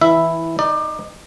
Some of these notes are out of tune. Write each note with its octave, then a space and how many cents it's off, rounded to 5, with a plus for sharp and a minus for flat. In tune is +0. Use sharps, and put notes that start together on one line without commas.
E3 -10 E4 +0 E5 +0
D#4 +0 D5 +25